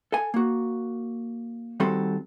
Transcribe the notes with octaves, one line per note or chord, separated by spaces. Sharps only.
A4 G#5
A#3 F#4
D#3 G3 C4 F#4 A4 C6